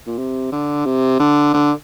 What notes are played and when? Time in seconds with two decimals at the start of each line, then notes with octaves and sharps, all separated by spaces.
0.07 A#2
0.18 C3
0.52 D3
0.85 C3
1.19 D3
1.54 D3